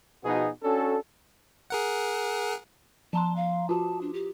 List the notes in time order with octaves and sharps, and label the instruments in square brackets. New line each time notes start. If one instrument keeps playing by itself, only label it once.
[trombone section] B2 F3 B3 D#4 F#4 G#4
C#4 D4 F#4 A4
[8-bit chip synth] G#4 A#4 F#5
[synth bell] F3 A#5 C6 [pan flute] A5
[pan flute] F5
[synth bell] F4 F#4 [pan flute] A5
[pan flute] D4
G4